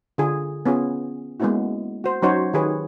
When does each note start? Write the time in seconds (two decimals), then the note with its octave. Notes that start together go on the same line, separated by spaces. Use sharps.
0.18 D3 F4 G#4
0.66 B3 C#4 F4 G#4
1.40 G#3 A#3 B3 C#4 E4 F#4
2.04 F#4 C5
2.22 F#3 C#4 D#4 F#4 C5 C#5
2.53 D#3 G4 G#4 B4 C#5